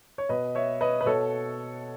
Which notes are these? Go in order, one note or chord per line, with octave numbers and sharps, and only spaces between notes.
C#5
B2 B4 D#5
C#5 E5
B4 D#5
B4
B2 A4 C#5